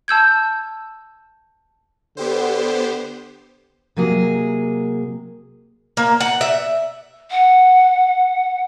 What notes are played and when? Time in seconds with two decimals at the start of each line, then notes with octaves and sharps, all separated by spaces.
0.08 A5 E6 G6 G#6
2.17 D3 B3 G4 C5
3.97 C3 F#3 A#3 G#4
5.97 A#3
6.20 F#5
6.41 E5
7.31 F#5